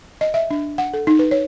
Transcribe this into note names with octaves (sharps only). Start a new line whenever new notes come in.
D#5
E5
D4
F#5
A4
D#4
B4
C#5